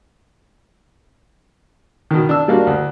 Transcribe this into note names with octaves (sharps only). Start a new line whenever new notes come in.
B2 D#3
D4 E6
G3 A#3 D4 F#4
D2